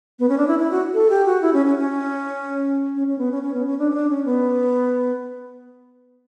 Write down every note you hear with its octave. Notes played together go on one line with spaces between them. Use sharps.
B3
C#4
D4
E4
E4
F#4
A4
G4
F#4
E4
C#4
C#4
C#4
C#4
C#4
B3
C#4
C#4
B3
C#4
D4
C#4
D4
C#4
B3